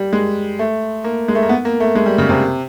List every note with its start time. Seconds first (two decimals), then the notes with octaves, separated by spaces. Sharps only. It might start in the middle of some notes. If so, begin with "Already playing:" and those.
Already playing: G3
0.13 G#3
0.59 A3
1.04 A#3
1.28 G#3
1.35 A3
1.43 A#3
1.49 B3
1.65 A#3
1.80 A3
1.95 G#3
2.06 G3
2.18 C#3
2.29 C3